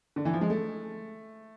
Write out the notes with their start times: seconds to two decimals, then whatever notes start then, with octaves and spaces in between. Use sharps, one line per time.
0.16 D3
0.25 E3
0.33 F3
0.41 G#3
0.50 A3